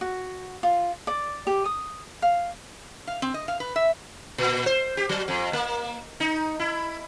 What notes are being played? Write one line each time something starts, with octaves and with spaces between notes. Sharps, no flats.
F#4
F4
D5
G4
D#6
F5
F5
C4
D#5
F5
B4
E5
A#2
C5
G4
F#3
F2
A#3
D#4
E4